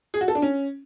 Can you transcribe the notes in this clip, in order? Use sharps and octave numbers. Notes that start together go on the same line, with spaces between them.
G#4
F#4
A4
D4
C#4